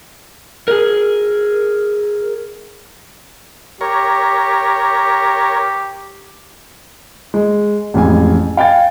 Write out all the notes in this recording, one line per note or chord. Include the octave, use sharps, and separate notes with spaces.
G#4 A#4
G4 A#4 C#5
G#3
A1 F2 G#3 G#5
F5 G5 G#5 A6